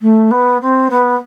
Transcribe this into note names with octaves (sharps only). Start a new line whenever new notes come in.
A3
B3
C4
B3